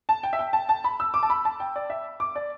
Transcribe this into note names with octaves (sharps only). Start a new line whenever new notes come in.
A5
G5
E5
G5
A5
A5
B5
E6
D6
A5
B5
A5
G5
D5
E5
D6
D5